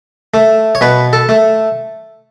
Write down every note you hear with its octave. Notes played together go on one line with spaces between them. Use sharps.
A3
C#5
B2 B4
A4
A3